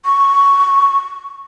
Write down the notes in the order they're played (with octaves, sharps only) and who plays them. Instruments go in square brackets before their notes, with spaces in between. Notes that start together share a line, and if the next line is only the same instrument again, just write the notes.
[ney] C#6